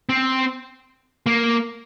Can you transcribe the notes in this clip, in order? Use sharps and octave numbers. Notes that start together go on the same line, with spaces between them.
C4
A#3